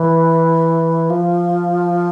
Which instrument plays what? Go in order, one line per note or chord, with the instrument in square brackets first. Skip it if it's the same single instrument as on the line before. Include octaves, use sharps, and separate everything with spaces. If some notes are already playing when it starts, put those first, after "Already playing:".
Already playing: [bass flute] E3
F3